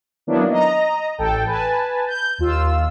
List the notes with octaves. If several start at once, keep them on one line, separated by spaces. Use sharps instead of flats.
D#3 F#3 A#3 B3 D4 E4
D#5 A#5
A1 A4 G5 A5
B4 G#5 A5
G6
D#2 F4 E6